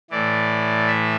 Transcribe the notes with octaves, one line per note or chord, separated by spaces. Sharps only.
A2 E3 D5
E5